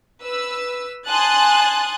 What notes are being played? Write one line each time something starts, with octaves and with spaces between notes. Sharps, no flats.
B4 E6
G#5 A5 C6 D#6 F#6 A6